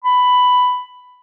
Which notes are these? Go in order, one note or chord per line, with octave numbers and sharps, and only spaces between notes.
B5